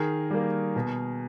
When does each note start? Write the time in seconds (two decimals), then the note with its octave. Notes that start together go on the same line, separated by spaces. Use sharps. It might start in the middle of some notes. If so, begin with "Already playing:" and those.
Already playing: D#3 G#4 A#4
0.30 G3 A#3
0.76 B2